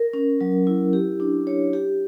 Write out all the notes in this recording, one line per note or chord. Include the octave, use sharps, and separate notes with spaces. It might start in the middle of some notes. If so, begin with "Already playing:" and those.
Already playing: A#4
C#4
F#3
E4
G4
D4
C#5
G4